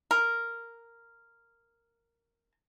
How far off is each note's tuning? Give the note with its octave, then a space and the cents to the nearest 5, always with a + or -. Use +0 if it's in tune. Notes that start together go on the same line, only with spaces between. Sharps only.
A#4 -5